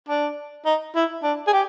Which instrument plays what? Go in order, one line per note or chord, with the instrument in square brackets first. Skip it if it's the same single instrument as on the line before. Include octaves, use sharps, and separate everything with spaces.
[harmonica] D4
D#4
E4
D4
G#4
G4